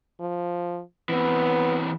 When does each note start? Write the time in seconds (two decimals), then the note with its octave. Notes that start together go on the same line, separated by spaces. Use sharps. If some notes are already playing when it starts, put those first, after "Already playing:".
0.20 F3
1.09 E3 B3 C4